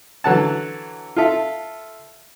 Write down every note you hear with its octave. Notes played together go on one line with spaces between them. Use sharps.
D3 E3 F#3 A4 F#5 A5
F4 A4 E5 F5